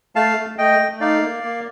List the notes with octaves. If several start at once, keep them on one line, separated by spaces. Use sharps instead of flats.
A3 F5 A5
A3
A3 D#5 G5
A3
D#4 D5 F5
A#3
A#3